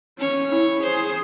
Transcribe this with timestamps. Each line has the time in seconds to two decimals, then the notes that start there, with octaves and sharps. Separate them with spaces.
0.19 C#4 C#5
0.52 E4
0.83 G#4 C5